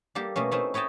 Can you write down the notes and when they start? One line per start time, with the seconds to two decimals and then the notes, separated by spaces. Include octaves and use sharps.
0.15 G3 A#3 G4 A4
0.36 B2 A3 A#3 C#4
0.52 A3 C4 C#4 D#4 E4
0.74 B4 C#5 D#5 G5 A5